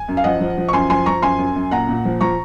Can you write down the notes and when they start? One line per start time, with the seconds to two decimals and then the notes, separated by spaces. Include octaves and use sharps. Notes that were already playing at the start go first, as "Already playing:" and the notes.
Already playing: G#5
0.09 F#2
0.17 F5
0.24 F3 D#5 F#5
0.40 F3
0.58 F3
0.68 C#6
0.73 F#2 G#5 C6
0.90 F3 G#5 C6
1.06 F3 A#5 C#6
1.22 F#2 G#5 C6
1.39 F#2
1.56 F#2
1.71 A#2 F#5 A#5
1.89 A#2
2.05 F3
2.21 F3 A#5 C#6